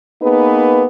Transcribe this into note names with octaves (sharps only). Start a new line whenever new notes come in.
A#3 B3 D#4 G#4 B4